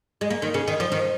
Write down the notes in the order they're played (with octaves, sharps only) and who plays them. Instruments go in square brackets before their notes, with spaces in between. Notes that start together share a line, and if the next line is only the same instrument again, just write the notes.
[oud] G#3
A#3
D#3
C#3
D#3
F3
D#3